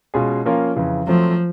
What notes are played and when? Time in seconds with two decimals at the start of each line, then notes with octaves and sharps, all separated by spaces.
0.14 B2 G#3 C#4 F4 G#4
0.45 F3 A#3 C#4 F4 A#4
0.76 F2 C#3 E3
1.07 F3 F#3 A3 C4